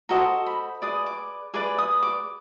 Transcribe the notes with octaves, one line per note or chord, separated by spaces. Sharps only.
F#4 A4 C5 D#5 A#5
B5
G#4 B4 D5 D#6
D6
G#4 B4 D5 D6
D#6
D6